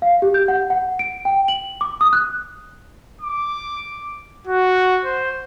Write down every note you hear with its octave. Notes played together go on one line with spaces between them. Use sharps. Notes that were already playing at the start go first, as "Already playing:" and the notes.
F5
G4
G6
F#5
F#5
D7
G5
F#7
D6
D#6
F#6
D6
F#4
C5